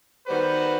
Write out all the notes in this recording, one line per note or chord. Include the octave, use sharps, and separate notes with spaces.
D#3 G3 B3 F#4 B4 C5